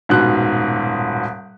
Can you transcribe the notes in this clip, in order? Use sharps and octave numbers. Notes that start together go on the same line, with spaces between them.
D#1 G#2 B2 F#6